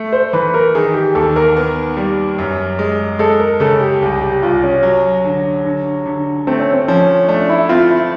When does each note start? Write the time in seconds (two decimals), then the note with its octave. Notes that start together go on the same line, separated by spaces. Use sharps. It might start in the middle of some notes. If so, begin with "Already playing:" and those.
Already playing: A3
0.13 C5
0.33 E3 B4
0.54 A#4
0.75 D#3 G#4
0.94 G4
1.15 D#2 A4
1.36 A#4
1.56 B3
1.97 G3
2.38 F#2
2.79 G#3
3.19 G#3 A4
3.40 A#4
3.60 C#3 A4
3.80 G4
4.01 C2 G4
4.22 G4
4.43 C2 F4
4.64 C#4
4.83 F#3
5.24 D3
5.65 D3
6.06 D3
6.47 A3 C4
6.60 C#4
6.73 C4
6.88 F3 C#4
7.28 A3 D4
7.49 E4
7.69 C4 F4
7.91 E4